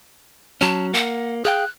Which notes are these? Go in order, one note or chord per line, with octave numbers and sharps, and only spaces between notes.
F#3 C#4 A5
A#3 F#5
G#4 F5 G5 F#6